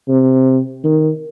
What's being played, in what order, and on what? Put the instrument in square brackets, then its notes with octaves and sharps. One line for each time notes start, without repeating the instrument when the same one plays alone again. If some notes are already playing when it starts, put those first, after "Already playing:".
[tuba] C3
D#3